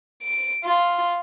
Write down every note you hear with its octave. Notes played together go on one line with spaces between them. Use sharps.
D7
F4